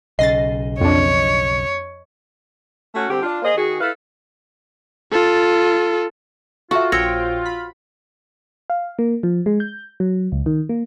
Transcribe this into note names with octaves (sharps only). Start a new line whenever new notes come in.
B1 C#3 D#5 A6 A#6 C7
F2 D4 C#5
A3 C#4 F#4
D3 G3 C4 G4
D4 F4
A#3 G#4 C5 D#5
D#3 F#4 G#4
E4 A4 B4 F5
F4 A4
F4 F#4 A4 E5 C#6
A#1 C5 C#5 G5 E6 A#6
B5
F5
A#3
F3
G#3
G6
F#3
C#2
D#3
A#3